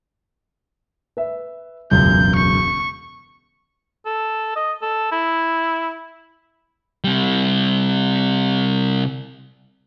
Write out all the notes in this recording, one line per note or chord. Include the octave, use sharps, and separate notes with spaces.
B4 E5
E1 C#2 F#2 G6
C#6
A4
D#5
A4
E4
C3 G3